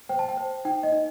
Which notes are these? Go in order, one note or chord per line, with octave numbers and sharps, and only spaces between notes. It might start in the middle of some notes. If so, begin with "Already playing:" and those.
C5 G5
A5
G5
C5
D#4 G5
D#5
D#4